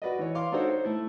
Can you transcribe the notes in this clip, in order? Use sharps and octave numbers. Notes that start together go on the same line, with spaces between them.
F#4 B4 D5 D#5
E3 C#5
F5 C6 D6
D4 D#4 F#4 A4 C5 C#5
C5
A3 E4